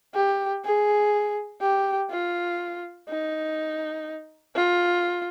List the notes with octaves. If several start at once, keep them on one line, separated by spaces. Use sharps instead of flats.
G4
G#4
G4
F4
D#4
F4